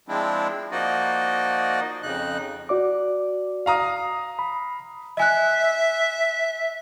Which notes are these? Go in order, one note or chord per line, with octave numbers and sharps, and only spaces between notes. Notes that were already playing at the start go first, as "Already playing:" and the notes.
F3 G#3 C4 D4 E4
F3 A#3 D#4 F#4 D5 D#5
F2 C#3 D#4 F#6
F#4 D5 D6
F5 A#5 D#6
B5
D#5 E5 G#5 F#6